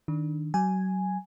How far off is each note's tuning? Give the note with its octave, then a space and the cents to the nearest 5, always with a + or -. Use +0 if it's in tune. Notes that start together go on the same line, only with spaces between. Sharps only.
D#3 +0 D4 +0
F#3 +30 G#5 +0